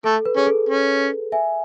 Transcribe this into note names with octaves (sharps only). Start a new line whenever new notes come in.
A3 A4
B4
C#4 G#4
A4
C#4
E5 G#5